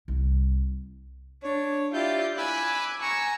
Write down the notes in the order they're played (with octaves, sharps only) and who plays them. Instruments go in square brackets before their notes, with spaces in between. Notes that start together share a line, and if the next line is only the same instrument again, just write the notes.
[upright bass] C2 E4
[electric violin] D4 [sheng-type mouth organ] C#5
[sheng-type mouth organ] E4 G6 [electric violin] F4 [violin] G4 D5
[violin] G#5 [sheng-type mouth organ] B5 D6 E6 [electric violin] F#6
[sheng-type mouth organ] G#5 A#5 [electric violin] C#6 [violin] E6